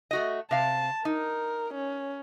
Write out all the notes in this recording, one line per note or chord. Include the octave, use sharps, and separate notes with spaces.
A3 F#4 D#5
C3 F5 A5
D#4 A#4
C#4